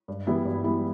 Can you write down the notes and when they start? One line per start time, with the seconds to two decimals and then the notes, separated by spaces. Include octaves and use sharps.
0.08 G2
0.27 E3 G3 B3 E4
0.45 G2
0.64 E3 G3 B3 E4